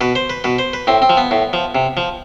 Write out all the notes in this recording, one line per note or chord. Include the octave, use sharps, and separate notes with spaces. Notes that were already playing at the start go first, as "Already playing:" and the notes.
B2 B4
C5
B4
B2 B4
C5
B4
A2 C4
C4
F3
B3
A2
F3
C3
F3